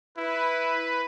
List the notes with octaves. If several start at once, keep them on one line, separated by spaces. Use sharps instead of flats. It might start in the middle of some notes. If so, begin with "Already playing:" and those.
E4 B4